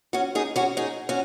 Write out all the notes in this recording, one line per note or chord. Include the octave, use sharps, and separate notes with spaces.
C#4 F#4
D#4 G#4
C#4 F#4
D#4 G#4
C#4 F#4